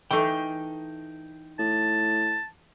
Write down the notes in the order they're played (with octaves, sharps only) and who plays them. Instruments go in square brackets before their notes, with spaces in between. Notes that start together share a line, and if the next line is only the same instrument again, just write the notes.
[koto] E3 A3 [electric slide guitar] D#4 G5
[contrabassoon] A2 [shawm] A5